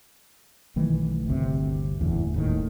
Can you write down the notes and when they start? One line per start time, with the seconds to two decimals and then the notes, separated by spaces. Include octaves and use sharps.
0.76 B1 D#3 E3 A3
1.26 G1 D2 C3
1.99 F#1 E2 A2 D3
2.34 D#1 A2 D#3